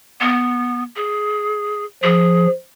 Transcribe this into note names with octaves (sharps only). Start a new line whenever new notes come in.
B3
G#4
F3 G#4